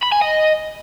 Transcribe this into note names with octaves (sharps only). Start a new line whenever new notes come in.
B5
G#5
D#5